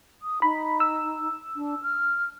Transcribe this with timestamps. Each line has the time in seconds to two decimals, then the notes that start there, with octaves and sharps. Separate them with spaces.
0.22 D#6
0.42 D#4 B5
0.80 E6
1.56 D4
1.82 F6